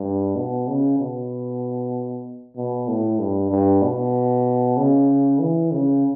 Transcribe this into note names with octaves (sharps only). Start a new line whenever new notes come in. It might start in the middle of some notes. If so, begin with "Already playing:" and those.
Already playing: G2
B2
C#3
B2
B2
A2
G2
G2
B2
C#3
E3
C#3